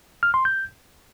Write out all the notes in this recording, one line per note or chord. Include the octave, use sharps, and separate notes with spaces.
F6
C6
G6